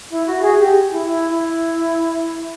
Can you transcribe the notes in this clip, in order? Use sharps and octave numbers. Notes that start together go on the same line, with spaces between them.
E4
F#4
G#4
G4
E4
E4
E4